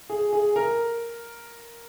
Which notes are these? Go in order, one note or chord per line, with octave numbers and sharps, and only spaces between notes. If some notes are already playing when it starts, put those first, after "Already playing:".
G#4
G#4
A#4